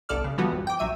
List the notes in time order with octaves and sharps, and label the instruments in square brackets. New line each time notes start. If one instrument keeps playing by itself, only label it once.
[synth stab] G1 C2 A4 D5 F6
C#3
E3 F3 G3 B3 F#4
G#1 F2
G5 D6
A#1 F#3 E5 D#7